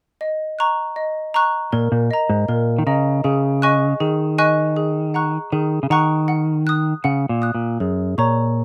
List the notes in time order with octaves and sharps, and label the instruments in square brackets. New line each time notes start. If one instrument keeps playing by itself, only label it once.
[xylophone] D#5
A#5 C#6 F#6
D#5
A#5 C#6 F#6
[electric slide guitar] A#2 [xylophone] A#4
[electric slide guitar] A#2
[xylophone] D#5 A#5
[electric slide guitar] G#2
[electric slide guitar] A#2 [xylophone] A#4
[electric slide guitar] D#3
[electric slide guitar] C#3 [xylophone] D#5 A#5
[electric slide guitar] C#3 [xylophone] G#4
[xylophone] D#5 G#5 C#6 F#6
[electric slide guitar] D#3 [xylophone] G#4
[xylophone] D#5 G#5 C#6 F#6
G#4
F#5 A#5 C#6 F#6
[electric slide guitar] D#3 [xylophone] G#4
[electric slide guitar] C#3
[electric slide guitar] D#3 [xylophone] F#5 A#5 C#6 F#6
[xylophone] F#5
D#6 F#6
[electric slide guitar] C#3 [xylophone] F#5
[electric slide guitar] A#2
[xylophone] D#6 F#6
[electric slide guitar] A#2
[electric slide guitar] F#2 [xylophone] G#4
[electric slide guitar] A#2 [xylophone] C#5 A#5 C#6